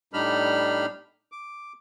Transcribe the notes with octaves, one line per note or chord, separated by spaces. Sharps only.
A2 G3 D4 D#4 B5 F6
D6